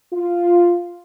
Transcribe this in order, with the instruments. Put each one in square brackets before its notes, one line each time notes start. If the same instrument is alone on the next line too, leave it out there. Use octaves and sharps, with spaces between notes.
[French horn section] F4